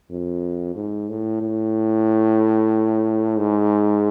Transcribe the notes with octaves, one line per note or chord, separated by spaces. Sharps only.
F2
G#2
A2
A2
G#2